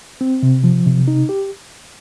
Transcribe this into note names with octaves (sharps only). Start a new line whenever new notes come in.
C4
C3
F3
C3
D#4
G4